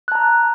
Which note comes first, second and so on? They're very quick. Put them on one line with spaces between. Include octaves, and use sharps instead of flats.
F#6 A5 A#5